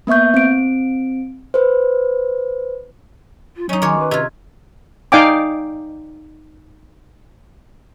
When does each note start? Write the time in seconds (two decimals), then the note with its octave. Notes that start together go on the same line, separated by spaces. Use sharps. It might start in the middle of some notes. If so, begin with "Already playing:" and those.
0.07 A#3 B3 E5 C#6 G6
0.34 C4 D7
1.54 B4 C5
3.57 F4
3.69 F#3 C#4 D#4 C#5 D#5 A#5
3.82 D#3 F#4 C#5 G#5 C6 D6
3.99 B4
4.11 C3 F4 D#5 G#6
5.12 D#4 D5 F5 G5 G#5 D6